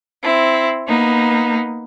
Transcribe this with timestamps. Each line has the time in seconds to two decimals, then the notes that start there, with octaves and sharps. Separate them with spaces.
0.22 C4 E4
0.88 A#3 B3 D#4